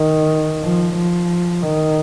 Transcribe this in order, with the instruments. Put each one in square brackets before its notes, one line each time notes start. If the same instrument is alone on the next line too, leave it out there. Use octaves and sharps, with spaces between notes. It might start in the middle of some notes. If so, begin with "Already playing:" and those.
Already playing: [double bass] D#3
F3
F3
D#3